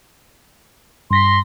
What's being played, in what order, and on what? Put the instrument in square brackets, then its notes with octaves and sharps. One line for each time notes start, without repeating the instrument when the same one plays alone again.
[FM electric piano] G2 A#6 B6 [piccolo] C6